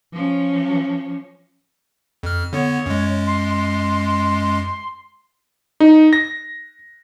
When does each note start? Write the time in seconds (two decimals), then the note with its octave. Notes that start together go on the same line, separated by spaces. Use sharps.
0.13 F3 C#4
2.23 F2 F6
2.53 D3 B3 C#5
2.86 F#2 G#3
3.27 C6
5.80 D#4
6.13 A#6